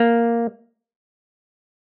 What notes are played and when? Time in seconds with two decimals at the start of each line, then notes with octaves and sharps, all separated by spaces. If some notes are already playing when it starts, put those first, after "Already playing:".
Already playing: A#3